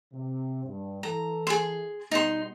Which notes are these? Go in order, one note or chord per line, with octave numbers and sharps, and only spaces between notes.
C3
G2
E3 A4 A#5
G#4 C6
B2 G3 B3 D#4 C6